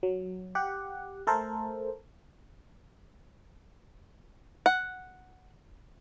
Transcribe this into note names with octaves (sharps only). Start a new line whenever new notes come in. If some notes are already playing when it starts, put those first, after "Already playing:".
F#3
G4 F#5
A3 A4 A#4 C5
F#5